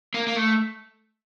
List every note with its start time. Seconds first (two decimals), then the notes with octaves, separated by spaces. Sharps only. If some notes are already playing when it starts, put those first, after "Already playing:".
0.14 A#3
0.27 A#3
0.36 A3